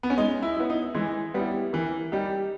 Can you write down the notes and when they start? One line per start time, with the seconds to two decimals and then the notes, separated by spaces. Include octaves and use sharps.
0.03 B3
0.10 C#4
0.17 G#3 D#4
0.42 E4
0.56 B3 E4
0.70 D#4
0.95 E3 G#3
1.34 G3 B3 E4
1.73 E3 A#3
2.12 G3 D#4 G4